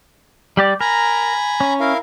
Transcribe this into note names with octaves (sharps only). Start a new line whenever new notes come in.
G3 G4 D5
A#4 G#5 A#5 B5
C#4
E4 A#4 F5